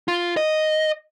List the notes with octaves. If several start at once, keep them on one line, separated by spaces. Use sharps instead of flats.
F4
D#5